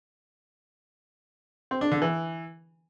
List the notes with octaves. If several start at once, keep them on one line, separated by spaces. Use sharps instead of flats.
C4
D4
D3
E3